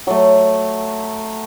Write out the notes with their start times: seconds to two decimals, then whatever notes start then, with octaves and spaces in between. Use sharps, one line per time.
0.07 F#3 A3